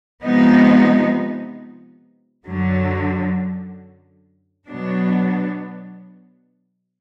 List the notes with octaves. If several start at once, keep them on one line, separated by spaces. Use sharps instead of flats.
C3 F3 G#3 B3 D#4
F#2 D3 F#3
B2 F#3 B3 D4